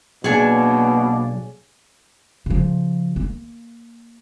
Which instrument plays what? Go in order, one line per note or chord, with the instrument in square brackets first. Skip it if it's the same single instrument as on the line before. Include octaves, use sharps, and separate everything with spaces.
[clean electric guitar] B1 D4 [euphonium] B2 [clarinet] A#3 [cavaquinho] G#4 C#5 G#5
[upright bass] C#3 F3
A#3